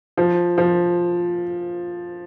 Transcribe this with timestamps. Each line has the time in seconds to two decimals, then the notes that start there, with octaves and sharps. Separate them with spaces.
0.17 F3
0.58 F3